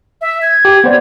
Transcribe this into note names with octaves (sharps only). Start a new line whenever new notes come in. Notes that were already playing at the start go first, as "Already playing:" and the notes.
E5
G#6
G4
B3 C5 D5